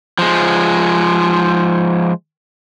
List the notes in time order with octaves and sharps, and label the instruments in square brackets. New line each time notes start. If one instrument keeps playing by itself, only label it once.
[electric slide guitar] F3 G#3